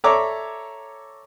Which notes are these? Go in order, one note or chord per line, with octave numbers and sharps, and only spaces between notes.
A4 C#5 D5 E5 A#5 D6